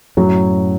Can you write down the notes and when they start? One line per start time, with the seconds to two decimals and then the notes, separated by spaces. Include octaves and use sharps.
0.17 F#2 A2 F#3